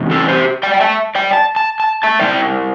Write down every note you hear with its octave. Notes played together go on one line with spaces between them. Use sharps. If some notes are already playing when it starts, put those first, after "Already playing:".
Already playing: E2 C3
E4 A4
G4 C5
D5 G5
G5
E5 A5
D5 G5
A5
A5
A5
E5 A5
G3 E4 D5 G5